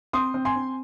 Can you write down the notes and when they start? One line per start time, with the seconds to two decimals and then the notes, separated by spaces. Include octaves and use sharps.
0.13 C4 C6 D#6
0.34 C4
0.45 G#5 C6
0.56 C4